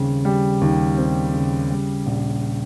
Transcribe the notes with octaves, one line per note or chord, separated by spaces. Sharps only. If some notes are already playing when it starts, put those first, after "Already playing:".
Already playing: D#2 C#3 G3 C4
G3
D#2
C4
C#3
G3
A#1